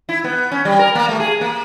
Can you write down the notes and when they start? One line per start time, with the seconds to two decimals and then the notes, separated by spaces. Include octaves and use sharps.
0.09 E4
0.24 B3
0.52 C#4
0.65 G3
0.79 A#4
0.95 A#3
1.09 A3
1.20 G#4
1.41 A#3